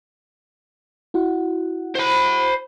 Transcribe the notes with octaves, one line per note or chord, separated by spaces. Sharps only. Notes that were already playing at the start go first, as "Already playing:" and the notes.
E4 F#4 F#5
C5 B5